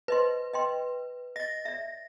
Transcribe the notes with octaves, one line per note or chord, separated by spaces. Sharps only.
B4 C5 D#5 C6
D#5 G5 C6
D#5 A6 A#6
D5 E5